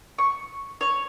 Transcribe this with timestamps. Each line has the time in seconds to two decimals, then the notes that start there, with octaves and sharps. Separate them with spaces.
0.19 C#6
0.81 C#5